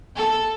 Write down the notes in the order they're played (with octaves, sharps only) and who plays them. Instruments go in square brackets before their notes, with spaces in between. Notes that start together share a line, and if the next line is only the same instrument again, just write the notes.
[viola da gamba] A4